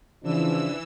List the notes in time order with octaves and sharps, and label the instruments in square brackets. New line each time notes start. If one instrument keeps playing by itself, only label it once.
[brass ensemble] C#3 F3 D4 [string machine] E3 E6